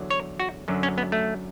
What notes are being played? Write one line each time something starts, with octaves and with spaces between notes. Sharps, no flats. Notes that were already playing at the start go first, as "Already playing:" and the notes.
Already playing: E2 D3 F#3
C#5
F#4
F#2 D3 F#3
C#4
B3
A3